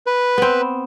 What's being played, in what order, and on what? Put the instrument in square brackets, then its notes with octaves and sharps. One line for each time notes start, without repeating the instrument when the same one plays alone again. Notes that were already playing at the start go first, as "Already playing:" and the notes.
[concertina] B4
[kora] B3 C4